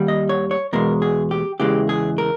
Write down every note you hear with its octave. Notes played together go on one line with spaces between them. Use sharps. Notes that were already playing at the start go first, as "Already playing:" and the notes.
Already playing: D#2 D#3 G3
D#5
C#5
C#5
E2 B2 G#3 A#4
G#4
G4
E2 C#3 E3 G#3 G4
G#4
A#4